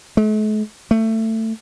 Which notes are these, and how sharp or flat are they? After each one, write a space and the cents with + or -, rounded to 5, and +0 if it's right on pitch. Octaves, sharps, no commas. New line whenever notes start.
A3 -45
A3 +20